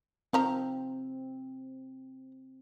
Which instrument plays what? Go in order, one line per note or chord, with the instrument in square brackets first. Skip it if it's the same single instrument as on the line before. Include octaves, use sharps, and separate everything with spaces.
[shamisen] D#3 F3 A#5 [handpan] C4